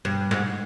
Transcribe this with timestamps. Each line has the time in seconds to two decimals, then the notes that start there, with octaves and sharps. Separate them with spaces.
0.05 G2
0.31 G#2